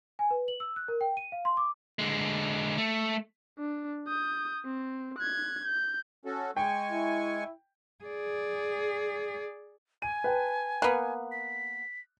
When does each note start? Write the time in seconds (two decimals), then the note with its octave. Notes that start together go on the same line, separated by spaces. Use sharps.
0.19 G#5
0.31 B4
0.48 F#7
0.60 E6
0.76 F#6
0.88 A#4
1.01 G5
1.17 D#7
1.32 F5
1.45 C6
1.57 D6
1.99 D3 G#3
2.78 A3
3.58 D4
4.08 D#6 G6
4.65 C4
5.19 F#6 G#6
5.66 G6
6.25 C#4 F#4 A4
6.56 G#3 G5 G#5 C#6
6.91 E4
8.04 G#4 D5
10.02 G#5 D#7
10.24 B4 G5 A5
10.82 A#3 B3 F#6
11.32 B6